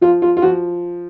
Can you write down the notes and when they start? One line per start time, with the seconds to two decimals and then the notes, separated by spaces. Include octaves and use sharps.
0.01 F3 F4
0.22 F4
0.37 F4
0.42 F3 F#4